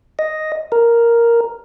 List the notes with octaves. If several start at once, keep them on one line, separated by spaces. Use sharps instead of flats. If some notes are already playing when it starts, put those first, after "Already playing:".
D#5
A#4